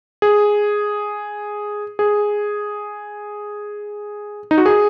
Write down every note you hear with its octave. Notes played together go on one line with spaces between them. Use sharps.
G#4
G#4
D#4
F#4
G#4